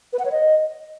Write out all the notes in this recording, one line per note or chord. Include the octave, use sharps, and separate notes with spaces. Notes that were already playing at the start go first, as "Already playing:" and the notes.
B4
F#5
C#5
D#5